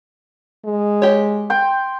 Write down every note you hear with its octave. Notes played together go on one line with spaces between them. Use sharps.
G#3
G4 C#5
G5 C6